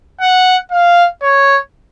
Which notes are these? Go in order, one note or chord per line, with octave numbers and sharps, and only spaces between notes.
F#5
F5
C#5